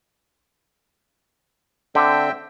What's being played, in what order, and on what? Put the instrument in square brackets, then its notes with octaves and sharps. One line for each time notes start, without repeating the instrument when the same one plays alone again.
[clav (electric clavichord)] D3 [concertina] C4 E5 G5